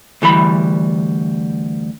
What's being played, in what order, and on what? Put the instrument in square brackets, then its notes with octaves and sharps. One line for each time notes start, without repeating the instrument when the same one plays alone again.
[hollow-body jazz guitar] D2 E3 G3 B5